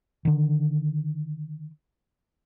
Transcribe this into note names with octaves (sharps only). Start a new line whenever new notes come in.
D3 D#3